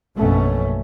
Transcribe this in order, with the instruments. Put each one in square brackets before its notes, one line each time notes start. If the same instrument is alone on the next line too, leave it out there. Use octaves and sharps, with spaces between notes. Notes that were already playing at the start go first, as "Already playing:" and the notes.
[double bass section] A#1 F#2 B2 A3 C#4